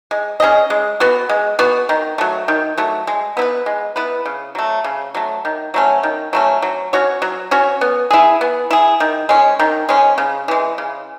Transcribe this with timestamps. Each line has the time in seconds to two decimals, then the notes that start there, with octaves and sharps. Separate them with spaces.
0.11 G#3
0.40 C#4 G#4 D#5
0.70 G#3
1.00 B3 F#4
1.29 G#3
1.59 B3 F#4
1.89 D#3
2.18 F#3 A3
2.48 D#3
2.78 F#3 A3
3.07 G#3
3.37 B3 E4
3.42 B4
3.66 G#3
3.96 B3 E4 B4
4.26 C#3
4.55 F#3 A3
4.84 C#3
5.15 F#3 A3
5.45 D#3
5.74 F#3 A3 C#4
6.03 D#3
6.33 F#3 A3 C#4
6.62 F#3
6.93 C#4 F#4 C#5
7.22 F#3
7.51 C#4 F#4 C#5
7.81 B3
8.11 E4 G#4
8.41 B3
8.71 E4 G#4
9.00 D#3
9.29 G#3 C#4
9.59 D#3
9.89 G#3 C#4
10.18 C#3
10.48 E3 G#3
10.78 C#3